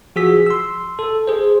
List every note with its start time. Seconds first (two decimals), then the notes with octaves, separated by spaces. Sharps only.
0.16 F3 F#4 G#4 E6 B6
0.46 C6 E6
0.99 A4
1.27 G#4 C5